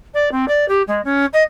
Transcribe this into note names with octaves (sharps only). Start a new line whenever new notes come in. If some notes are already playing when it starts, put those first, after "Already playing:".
D5
C4
D5
G4
G#3
C#4
D#5